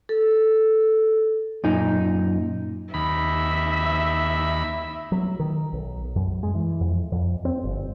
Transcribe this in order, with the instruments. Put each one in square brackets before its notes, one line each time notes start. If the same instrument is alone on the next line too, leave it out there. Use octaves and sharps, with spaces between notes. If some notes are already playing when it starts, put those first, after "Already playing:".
[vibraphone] A4
[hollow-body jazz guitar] F#2 A#2 D#4
[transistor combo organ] D#2 B5 [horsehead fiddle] E5
[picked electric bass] F#3
D#3
B1
F#2
G#3
E3
F2
F2
C4
G1